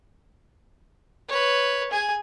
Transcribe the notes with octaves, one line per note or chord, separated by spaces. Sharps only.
B4 C#5
G#4 G#5